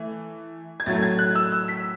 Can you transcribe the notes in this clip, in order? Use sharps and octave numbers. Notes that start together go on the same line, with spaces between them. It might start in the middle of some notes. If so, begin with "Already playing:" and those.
Already playing: E3 A3
G#6
A2 F#3 A3 A6
G#6
F#6
E6
E6
B6